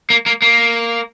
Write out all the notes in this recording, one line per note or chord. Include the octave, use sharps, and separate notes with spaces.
A#3
A#3
A#3